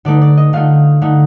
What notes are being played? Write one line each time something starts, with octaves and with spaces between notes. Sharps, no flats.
D3 A3 D#4 D5
D5
D#5
D3 A3 D#4 F4 F5
D3 A3 D#4